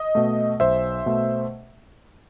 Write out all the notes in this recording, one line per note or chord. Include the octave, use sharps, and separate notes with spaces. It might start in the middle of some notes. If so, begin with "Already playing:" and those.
Already playing: D#5
B2 A3
B1 C5 E5
B2 A3